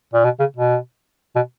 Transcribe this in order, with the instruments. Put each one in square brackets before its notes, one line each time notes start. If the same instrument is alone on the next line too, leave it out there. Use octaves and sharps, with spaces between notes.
[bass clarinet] A#2
B2
C#3
B2
B2